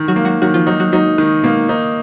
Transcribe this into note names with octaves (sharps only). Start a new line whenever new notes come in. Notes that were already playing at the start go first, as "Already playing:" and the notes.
Already playing: D#3
F#3 F#4
A#3
F#3 F#4
D#3 F#3 F#4
F3 F4
F#3 D#4 F#4
F#3 F#4
F#3 D#4 F#4
D#3
B2 A#3 B3
D#4